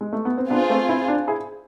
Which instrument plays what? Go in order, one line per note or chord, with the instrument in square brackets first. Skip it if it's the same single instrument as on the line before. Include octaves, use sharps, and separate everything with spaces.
[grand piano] G#3
A3
B3
C4
[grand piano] B3 D4 [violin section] F4 G#4 C5
[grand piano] A3 C4
C4 E4
D4 F4
E4 G#4